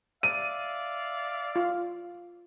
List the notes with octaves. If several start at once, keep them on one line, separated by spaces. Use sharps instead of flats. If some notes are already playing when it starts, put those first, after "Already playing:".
D5 E5 F5 D#7
F4